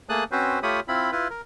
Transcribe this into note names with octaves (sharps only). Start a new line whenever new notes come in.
A3 A#3 G#4 A5 D#6 F#6
C4 C#4 F#4 B4 C5
A3 F4 G4 C#5 B5 D#6
C4 E4 F4 B5
E4 F4 B4
A#4